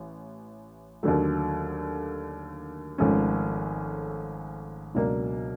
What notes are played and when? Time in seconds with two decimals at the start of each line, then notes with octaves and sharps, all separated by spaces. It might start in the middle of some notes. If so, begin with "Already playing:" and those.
Already playing: A1
1.03 D#2 D3 F#3 A3
2.98 G#1 G#2 F3 A3 C#4
4.95 C#2 B2 F#3 A#3 D4